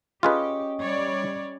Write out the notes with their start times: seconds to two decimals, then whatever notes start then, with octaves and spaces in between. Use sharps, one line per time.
0.23 C#4 F4 G4 G#4 B4 D#5 C#6
0.79 G3 C#5 D5